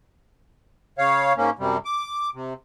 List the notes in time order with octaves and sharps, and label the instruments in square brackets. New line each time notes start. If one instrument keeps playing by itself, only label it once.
[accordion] C#3 C#5 F5
G#2 A#3 C#4
F#2 C3 G3
D6
C3